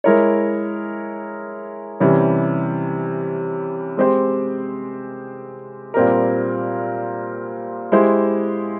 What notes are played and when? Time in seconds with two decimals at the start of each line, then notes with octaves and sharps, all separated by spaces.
0.04 G#3 E4 A#4 C#5
2.00 C3 E3 G3 C#4
3.97 G#3 C4 G4 C5
5.94 A#2 G3 C4 G4 A#4
7.92 G#3 E4 G4 C5